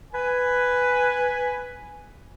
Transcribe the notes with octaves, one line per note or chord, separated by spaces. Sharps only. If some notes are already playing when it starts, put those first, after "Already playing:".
B4 G#5